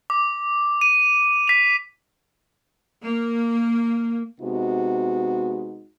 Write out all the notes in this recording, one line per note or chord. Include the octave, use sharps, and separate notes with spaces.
D6
D#7
B6 F7
A#3
C3 G#3 B3 D#4 F#4